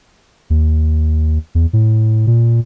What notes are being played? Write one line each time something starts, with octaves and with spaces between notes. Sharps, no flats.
D#2
E2
A2
A#2